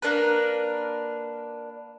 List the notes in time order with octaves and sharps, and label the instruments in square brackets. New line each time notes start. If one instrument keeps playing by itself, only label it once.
[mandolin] A#3 D4 A#4 B4